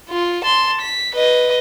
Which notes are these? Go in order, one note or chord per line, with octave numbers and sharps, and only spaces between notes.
F4
A5 C6
B6
B4 D#5